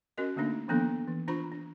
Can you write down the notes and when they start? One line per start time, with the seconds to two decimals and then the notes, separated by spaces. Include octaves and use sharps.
0.18 C#4 F#4 A#4 D#5
0.36 D3 A3 A#3 D4 D#4
0.68 D#3 F3 A#3 B3 D4 A4
1.07 E3
1.28 D4 F4 C5 A#5 B5 C#6
1.52 D4